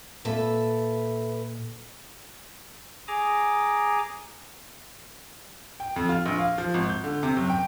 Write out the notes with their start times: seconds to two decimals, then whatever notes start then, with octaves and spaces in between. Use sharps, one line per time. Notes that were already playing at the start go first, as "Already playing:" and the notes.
0.25 A#2 A4 B4 E5
3.08 G#4 G#5 A#5 D6
5.80 G5
5.96 F2
6.09 F4
6.26 A#1
6.39 F5
6.58 F3
6.74 G#1
6.89 G6
7.04 D3
7.23 C3
7.36 F#1
7.50 G5